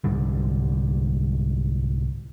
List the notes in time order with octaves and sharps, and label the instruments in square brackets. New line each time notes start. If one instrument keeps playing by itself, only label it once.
[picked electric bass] C2 G#2 D3 G3